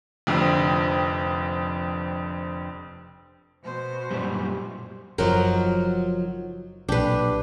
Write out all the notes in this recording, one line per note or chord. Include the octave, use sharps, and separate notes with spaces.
F1 F2 D3 C4
B2 C5
F#2 A#2 G3
F#1 F3 F#3 D#4 A#4
B1 A#2 D4 G4 B4